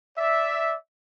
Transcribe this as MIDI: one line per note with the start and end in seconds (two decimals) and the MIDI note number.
0.18 0.74 74
0.18 0.74 76